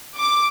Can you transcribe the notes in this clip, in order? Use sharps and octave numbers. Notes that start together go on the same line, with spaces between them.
D6